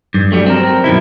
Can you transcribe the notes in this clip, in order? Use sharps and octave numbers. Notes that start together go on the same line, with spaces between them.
G2
F#3 G3 A3
C4 A#4
F#2 B2 D#3 E4